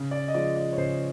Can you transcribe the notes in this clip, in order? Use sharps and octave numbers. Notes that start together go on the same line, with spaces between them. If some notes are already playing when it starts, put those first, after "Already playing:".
Already playing: C#3
D5
D#5
F3 G#3 D5
D5
C#5
C#3 C5